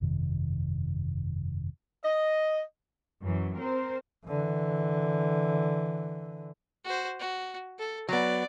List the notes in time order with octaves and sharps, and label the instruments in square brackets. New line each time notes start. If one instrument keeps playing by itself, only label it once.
[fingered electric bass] G1 F2 C3 D#3
[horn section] D#5
[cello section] F#2 E3 F#3
C4 A#4 C5
[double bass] D3 E3
[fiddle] F#4 C5
F#4
A4
[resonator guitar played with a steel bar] F#3 B3 [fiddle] D5